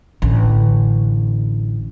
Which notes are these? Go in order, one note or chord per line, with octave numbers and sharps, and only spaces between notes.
A1 D3